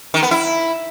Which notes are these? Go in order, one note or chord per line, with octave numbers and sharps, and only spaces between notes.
D#3
B3
E4